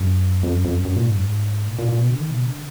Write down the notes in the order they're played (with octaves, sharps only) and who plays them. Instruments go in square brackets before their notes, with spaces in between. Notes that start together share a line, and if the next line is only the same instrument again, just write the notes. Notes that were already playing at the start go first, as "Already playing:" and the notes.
Already playing: [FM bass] F#2
F2
F#2
F2
F#2
F#2
A#2
G#2
F#2
G#2
A#2
A#2
A#2
B2
D3
D#3
B2
D3